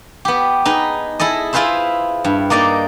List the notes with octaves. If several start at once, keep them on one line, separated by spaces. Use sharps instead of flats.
B3 G4
D#4 G#4 B4
E4 G#4 A4 D#5
E4 F4 G#4 B4 C5 E5
G2
A#3 D#4 D5 D#5